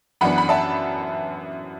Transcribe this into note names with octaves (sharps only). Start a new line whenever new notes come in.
F#2 E3 B3 D4 F#5 B5
B5
E5 A5